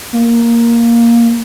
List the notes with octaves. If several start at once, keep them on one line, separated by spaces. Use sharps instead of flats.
A#3